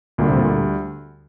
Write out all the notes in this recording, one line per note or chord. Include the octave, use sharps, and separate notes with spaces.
D2 A#2 D3 G3
C3
A#2